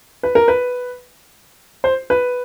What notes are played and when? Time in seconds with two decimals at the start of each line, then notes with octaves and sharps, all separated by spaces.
0.23 B4
0.35 A#4
0.48 B4
1.84 C5
2.10 B4